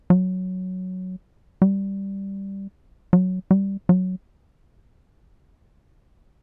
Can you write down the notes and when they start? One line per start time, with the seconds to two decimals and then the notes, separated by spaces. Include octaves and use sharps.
0.10 F#3
1.62 G3
3.13 F#3
3.51 G3
3.89 F#3